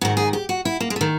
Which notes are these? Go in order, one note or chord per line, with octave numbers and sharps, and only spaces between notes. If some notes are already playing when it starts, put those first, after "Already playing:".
G#2 D#3 F#4
G#4
G4
F#4
E4
A#3
G#3
D#3 A3